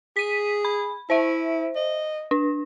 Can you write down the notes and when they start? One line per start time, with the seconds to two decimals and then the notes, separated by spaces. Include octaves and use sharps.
0.16 G#4 B6 D#7
0.65 B5
1.10 E4 C5 E5
1.76 D#5
2.31 D4